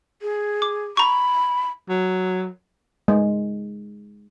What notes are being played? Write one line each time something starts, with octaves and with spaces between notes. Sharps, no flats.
G#4
D6
A#5 B5 C#6
F#3
G#3